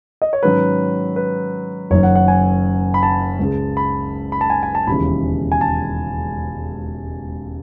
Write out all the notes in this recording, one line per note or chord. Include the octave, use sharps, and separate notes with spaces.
D#5
C#5
G#2 D#3 F#3 C#4 B4
B4
F#1 F#2 D#3 F#3 C#5
F#5
F#5
G#5
B5
A5
C#2 C#3 G#3
B5
B5
A5
G#5
G#5
A5
E1 D#2 C#3 E3 B5
G#5
A5